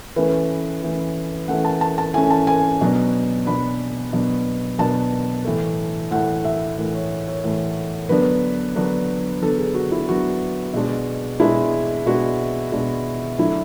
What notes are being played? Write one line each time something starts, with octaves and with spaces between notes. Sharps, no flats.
E3 A3 C#4 B4
E3 A3 C#4
E3 A3 C#4 F#5
A5
A5
A5
E3 A3 C#4 G#5
A5
G#5
B2 F#3 B3 D4
B2 F#3 B3 D4 B5
B2 F#3 B3 D4
B2 F#3 B3 D4 A5
A2 E3 A3
A2 E3 A3 F#5
E5
A2 E3 A3
C#5
C#5
A2 E3 A3
D3 F#3 B3 D4 B4
D3 F#3 B3 D4
D3 F#3 B3 D4 A4
G#4
F#4
E4
D3 F#3 B3 D4 F#4
B2 G#3 D4
B2 G#3 D4 E4
B2 G#3 D4 F#4
B2 G#3 D4
D3 F#3 A3 D4 E4